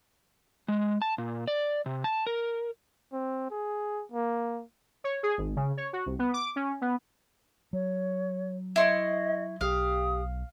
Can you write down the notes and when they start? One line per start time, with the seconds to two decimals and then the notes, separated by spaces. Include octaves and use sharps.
0.68 G#3
1.02 A5
1.18 A#2
1.47 D5
1.86 C3
2.04 A5
2.27 A#4
3.13 C4
3.51 G#4
4.12 A#3
5.04 C#5
5.23 G#4
5.38 G#1
5.56 C#3
5.77 C#5
5.93 F#4
6.06 C2
6.19 B3
6.34 D6
6.56 C#4
6.81 B3
7.73 F#3 C#5
8.76 E4 D#5 C6 C#6
9.61 B1 G4 F5 D#6